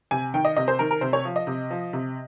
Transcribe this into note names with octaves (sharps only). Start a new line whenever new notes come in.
C3 G#5
D#3 G5
D#5
C3 D#5
C5
D#3 A#4
A#4
C3 C5
C#5
F3
D#5
C3
F3
C3